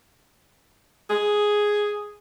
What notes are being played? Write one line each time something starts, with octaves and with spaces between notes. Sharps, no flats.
G#4